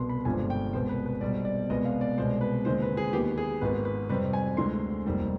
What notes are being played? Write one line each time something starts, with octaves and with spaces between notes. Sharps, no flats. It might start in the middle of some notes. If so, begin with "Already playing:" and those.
Already playing: C2 B2 B3 C6
B5
G1 G2 F3 G#3 C4 G#5
G5
C2 B2 G#3 B3 C5
B4
B4
B1 B2 G3 C4 D5
D5
C2 B2 G#3 B3 D#5
F5
D5
C2 B2 G#3 C5
B4
D#2 D3 G#3 C4 C5
B4
G#4
D#2 D#3 B3 G4
G#4
G#1 G#2 D#3 B3 B4
B4
F2 C3 G3 C4 B4
G#5
D2 D3 G#3 C4 C6
F1 D#2 D#3 G3 C4